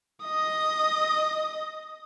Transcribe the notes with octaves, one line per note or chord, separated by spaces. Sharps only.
D#5 D#6